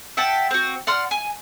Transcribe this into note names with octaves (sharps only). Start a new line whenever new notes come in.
E5 F#5 G5 A5
C4 F#4
D5 F#5 C6 F6
G#5